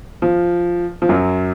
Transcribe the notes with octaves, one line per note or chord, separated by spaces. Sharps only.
F3
F3
F#2 F#3